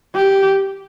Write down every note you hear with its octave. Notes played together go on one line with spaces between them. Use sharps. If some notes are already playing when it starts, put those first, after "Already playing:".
G4